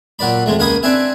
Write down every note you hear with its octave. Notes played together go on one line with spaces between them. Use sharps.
A#2 F#3 B4 D5 B5
F2 G#3 A3
C#2 A#3 F5 G#5 B5 D#6
C4 D4 B4 E5 G#5